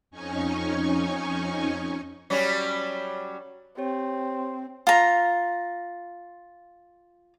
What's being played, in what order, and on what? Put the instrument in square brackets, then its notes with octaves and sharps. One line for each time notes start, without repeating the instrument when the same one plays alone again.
[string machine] F2 C#4 D#4 G#5 C#6
[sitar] F#3 G3 C#4
[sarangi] C4 [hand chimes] G4 C#5
[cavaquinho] F4 A#5